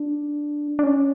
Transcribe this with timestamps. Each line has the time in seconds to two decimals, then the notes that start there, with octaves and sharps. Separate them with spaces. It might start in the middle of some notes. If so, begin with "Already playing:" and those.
Already playing: D4
0.79 D4
0.83 C#4